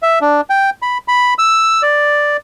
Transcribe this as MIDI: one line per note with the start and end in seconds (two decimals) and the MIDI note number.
0.03 0.19 76
0.21 0.41 62
0.50 0.70 79
0.82 0.98 83
1.08 1.34 83
1.38 1.82 88
1.82 2.37 74